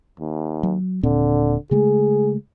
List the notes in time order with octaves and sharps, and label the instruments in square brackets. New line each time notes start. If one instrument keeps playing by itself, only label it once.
[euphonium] D#2
[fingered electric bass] F#3
[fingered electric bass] D#1 A#2 C4 [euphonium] D3
[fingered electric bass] C#3 G#3 A3 [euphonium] G#4